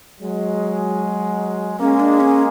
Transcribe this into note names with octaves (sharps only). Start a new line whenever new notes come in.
F#3 G#3
G#3 A#3 C#4
D4
C#4